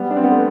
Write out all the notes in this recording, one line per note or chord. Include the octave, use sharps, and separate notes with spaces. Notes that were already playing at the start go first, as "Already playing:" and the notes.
Already playing: G3 B3
D4
C4
B3
A3 C4